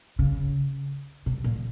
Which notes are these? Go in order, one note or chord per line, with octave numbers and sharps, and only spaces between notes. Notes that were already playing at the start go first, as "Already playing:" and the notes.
C#3
B2
A#2